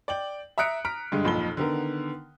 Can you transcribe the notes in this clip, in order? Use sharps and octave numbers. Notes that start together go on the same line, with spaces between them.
D5 G5 F#7
E5 A#5 D#6 F#6 C#7 D7
A#5 F6 B6 D7
G2 D3 G#3
B1 F2 A#2 A5 B5 G7
D3 D#3 B3 A#4